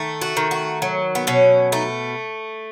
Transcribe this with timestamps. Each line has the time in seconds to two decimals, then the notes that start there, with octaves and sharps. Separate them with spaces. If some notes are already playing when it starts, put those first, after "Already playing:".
Already playing: D#3 A3
0.22 F#4
0.37 D#3
0.51 F#4
0.82 F#3
1.15 B3
1.27 B2 C#4
1.72 A3 D#4